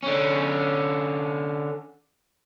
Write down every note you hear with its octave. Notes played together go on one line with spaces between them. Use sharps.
D3 C#4